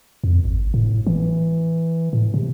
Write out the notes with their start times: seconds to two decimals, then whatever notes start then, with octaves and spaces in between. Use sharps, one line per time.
0.24 F2
0.45 G#1
0.74 A2
1.07 E3
2.13 A2
2.34 C3